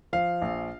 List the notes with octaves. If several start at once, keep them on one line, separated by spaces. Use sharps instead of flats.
F3 F5
A#1